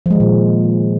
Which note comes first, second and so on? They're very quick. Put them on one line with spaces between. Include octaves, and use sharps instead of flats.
F3 G#3 D#3 A#2